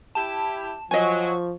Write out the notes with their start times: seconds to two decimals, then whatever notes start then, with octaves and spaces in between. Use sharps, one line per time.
0.15 E4 G4 A5
0.91 F3 F#3 D#5 G#5 C#6